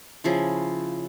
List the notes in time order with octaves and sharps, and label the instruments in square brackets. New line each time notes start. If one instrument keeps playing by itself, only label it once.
[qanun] C#3 F3 E4